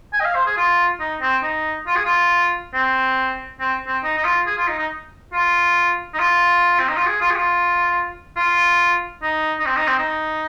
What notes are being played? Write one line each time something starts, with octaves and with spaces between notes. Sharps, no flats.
G#5
D#5
F5
C5
G#4
F4
D#4
C4
D#4
F4
G#4
F4
C4
C4
C4
D#4
D#4
F4
G#4
F4
D#4
D#4
F4
D#4
F4
C4
D#4
F4
G#4
F4
G#4
F4
F4
D#4
D#4
C4
D#4
C4
D#4